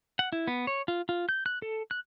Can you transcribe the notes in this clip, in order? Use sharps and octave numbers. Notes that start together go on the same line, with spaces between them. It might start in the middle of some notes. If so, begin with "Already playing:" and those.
F#5
E4
B3
C#5
F4
F4
G6
F#6
A4
F#6